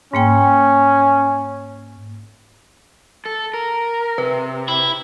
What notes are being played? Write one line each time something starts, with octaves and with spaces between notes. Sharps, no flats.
G#2 A#3 C#4 G5
A4
A#4
C3 B4
E4